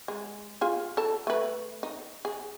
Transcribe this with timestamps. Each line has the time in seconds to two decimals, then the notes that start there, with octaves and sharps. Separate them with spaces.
0.08 G#3
0.61 F4 G#4
0.97 A4 A5
1.27 A3 B4
1.83 D#4
2.25 G#4